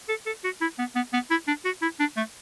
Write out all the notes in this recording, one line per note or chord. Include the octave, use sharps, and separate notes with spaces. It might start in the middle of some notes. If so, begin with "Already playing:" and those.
A4
A4
F#4
E4
B3
B3
B3
E4
D4
F#4
E4
D4
A3